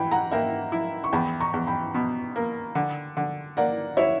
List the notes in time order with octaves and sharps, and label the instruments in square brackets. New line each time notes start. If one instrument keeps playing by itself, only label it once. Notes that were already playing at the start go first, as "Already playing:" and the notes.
Already playing: [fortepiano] E3 [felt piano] G5 B5
[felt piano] F#5 A#5
[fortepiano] A#3 [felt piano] E5 G5
[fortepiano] E4
[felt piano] C#6
[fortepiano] E2 [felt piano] G5 B5
[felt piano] A#5 C#6
[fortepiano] E2
[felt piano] G5 B5
[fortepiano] B2
A#3
D3
D3
[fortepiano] A#3 [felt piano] D5 F#5
[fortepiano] E4 [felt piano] C#5 E5